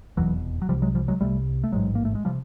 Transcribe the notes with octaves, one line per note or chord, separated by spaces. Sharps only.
F1 E2 B2 E3 F#3
F#3
C2 C3 F3 G3
F#3 G#3
F3 G3
F#3 G#3
C2 C3 G3 A3
A3
A1 G#2 F#3 G#3
A#3
A3
G#3
C3 F3 G3